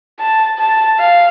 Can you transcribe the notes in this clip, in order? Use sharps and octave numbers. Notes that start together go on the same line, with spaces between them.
A5
A5
F5